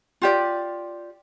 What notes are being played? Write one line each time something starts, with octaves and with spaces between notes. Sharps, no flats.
F4 G4 D5